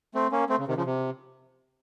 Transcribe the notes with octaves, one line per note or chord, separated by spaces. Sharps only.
A3 C4
A#3 C#4
A3 C4
C#3
C3 D#3
C#3 F3
C3